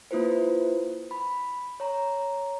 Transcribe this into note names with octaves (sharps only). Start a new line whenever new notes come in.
A#3 E4 F4 B4 C5
B5
C#5 A#5